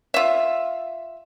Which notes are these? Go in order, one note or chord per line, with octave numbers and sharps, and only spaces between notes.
F4 E5